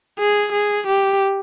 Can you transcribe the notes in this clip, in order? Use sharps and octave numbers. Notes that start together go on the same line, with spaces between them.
G#4
G#4
G4